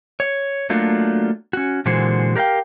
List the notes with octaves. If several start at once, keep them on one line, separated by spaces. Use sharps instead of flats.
C#5
F#3 A3 A#3 D4 F4 F#4
C#4 F#4
A#2 D3 E3 G#3 F#4 C5
G4 A#4 C5 F5 G5